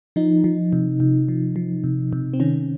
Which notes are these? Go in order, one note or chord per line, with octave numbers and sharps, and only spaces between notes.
F3 D#4
F3
C3
C3
F3
F3
C3
C3
C4
D#3 C#4